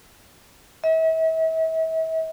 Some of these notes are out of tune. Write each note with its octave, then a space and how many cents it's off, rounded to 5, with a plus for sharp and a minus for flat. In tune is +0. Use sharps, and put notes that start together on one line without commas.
E5 -40